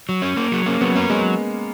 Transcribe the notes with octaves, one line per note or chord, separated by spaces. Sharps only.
F#3
C#4
A#3
F#3
A#3 C#4
F#3 B3
A#3 C#4
F#3 G#3